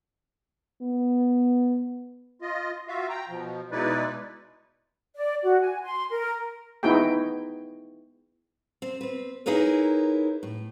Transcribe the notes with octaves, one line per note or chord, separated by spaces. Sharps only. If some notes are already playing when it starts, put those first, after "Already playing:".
B3
F4 D#5
F4 F#4 E5 F5
G5 A#5
B2 F3
B2 G#3 D#4 E4 B4 D5
D5
F#4
G#5
C6
A#4
B3 D#4 E4 F#4 G#4 G5
C4
C4 B4
D#4 E4 G#4 A#4 B4 C#5
A2